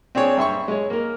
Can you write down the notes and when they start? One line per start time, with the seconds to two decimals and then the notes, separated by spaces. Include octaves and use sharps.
0.15 C4 D4 G#4 C#5
0.37 G2 E5 C6 C#6
0.68 G#3 C#5
0.90 A#3 A#4